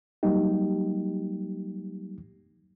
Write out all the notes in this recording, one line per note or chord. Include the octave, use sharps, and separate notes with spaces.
F#3 G3 A#3 D#4 G4